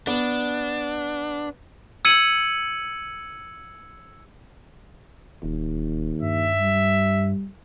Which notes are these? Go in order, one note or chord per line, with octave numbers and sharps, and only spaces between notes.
B3 D4
E6 G#6 C#7 D#7 F#7
D1 D#2
G2 E5
G3